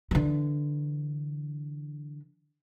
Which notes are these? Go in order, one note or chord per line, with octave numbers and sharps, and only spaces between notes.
D3 E3